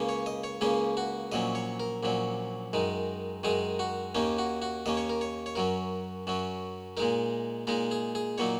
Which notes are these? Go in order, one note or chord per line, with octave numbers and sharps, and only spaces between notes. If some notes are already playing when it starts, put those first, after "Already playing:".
Already playing: C#2 C#3 A#3 C#4
C#5
D#5
C#5
C#2 C#3 A#3 C#4 G#4
F#4
A#1 A#2 F#3 C#4 D#5
C#5
A#4
A#1 A#2 F#3 C#4
F#2 D#3 G#3 D#4
F#2 D#3 G#3 D#4 G#4
F#4
D#2 D#3 A#3 C#4 D#4
F#4
F#4
D#2 D#3 A#3 C#4 D#5
C#5
A#4
C#5
C#5
F#2 F#3 C#4 A#4
F#2 F#3 C#4
A#2 G#3 D#4 A#4
A#2 G#3 D#4 A#4
G#4
G#4
A#2 F#3 A#3 D#4 C#5